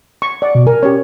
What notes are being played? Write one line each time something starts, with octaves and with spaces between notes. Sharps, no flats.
C#6
D5 F#5
B2
A#4 G#5
C#4 G4 C#5